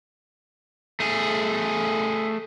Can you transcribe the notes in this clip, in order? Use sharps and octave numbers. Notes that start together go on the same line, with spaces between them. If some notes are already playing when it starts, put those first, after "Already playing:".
A3 G#4